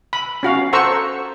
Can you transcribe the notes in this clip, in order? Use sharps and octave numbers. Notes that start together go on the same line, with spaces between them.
B5
C#4 F#4 F5
A4 C5 F#5 A#5 C#6 E6